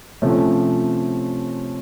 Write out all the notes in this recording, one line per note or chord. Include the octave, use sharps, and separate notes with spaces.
C3 F3 A3 C#4